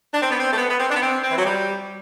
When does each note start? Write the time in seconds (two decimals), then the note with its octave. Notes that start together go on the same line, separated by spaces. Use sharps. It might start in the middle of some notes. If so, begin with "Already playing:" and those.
0.14 D4
0.21 C4
0.31 B3
0.38 C4
0.52 A3
0.58 B3
0.69 B3
0.80 C4
0.90 D4
0.96 B3
1.02 C4
1.24 C4
1.30 E3
1.38 F#3
1.45 G3